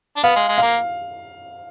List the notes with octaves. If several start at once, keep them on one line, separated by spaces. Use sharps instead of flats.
D4
B3 F5
G#3
G#3
A#3 F5